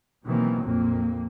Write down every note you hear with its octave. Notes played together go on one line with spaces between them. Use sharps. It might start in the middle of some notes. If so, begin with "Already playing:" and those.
B2 D#3 E3 F#3 A#3 C4
A#1 F2 A#2 A#3